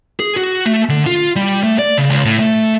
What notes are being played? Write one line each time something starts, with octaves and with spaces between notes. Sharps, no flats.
G#4
F#4
A3
D3
F4
G3
A3
D5
C#3
C#2
A2
A3